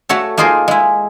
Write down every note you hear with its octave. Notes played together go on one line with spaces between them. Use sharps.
A3 F#4 A4 C#5
A#3 D#4 F4 G#4 A#4 C5
G#3 E4